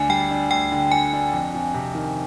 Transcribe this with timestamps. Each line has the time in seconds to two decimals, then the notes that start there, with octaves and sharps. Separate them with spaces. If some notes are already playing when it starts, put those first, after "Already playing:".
Already playing: D2 D4 G#5
0.09 G3 G5
0.31 D4
0.51 D2 G5
0.72 D3
0.92 D4 G#5
1.13 D4
1.33 F2
1.54 F2
1.74 C3
1.95 D#3